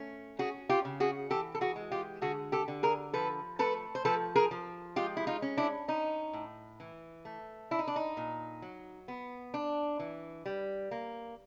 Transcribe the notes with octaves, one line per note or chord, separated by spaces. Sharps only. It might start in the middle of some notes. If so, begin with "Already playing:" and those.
Already playing: A3 C#4
C#4 F#4 G#4
F4 G4
C#3
F#4 G#4
E3 G4 A4
A4
F#4 G#4
G#3
F4 G4
D3 F#4 G#4
G4 A4
D3
G#4 A#4
F3 A4 B4
A3 A4 B4
C5
F3 A4 B4
G#4 A#4
F3
G#3 F4 G4
E4
D#4 F4
C#4
D4 E4
C#4 D#4
A2
E3
A3
D4 E4
D#4
D4
D#4
A#2
F#3
B3
D4
E3
G3
A#3